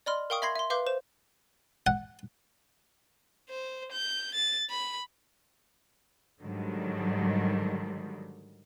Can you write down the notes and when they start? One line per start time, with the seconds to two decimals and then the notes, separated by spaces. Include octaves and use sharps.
0.06 D5 D#5 B5 C6 F6
0.30 A#4 F5 G5 C#6 D#6
0.42 E5 B5 C6 G#6 A#6 C7
0.56 E5 C6
0.70 B4 E5 F5 C6 D6 G6
0.86 C5 E7
1.87 F#5
3.50 C5
3.92 G6
4.35 A6
4.70 B5
6.42 G#2 D3 D#3 F#3 G3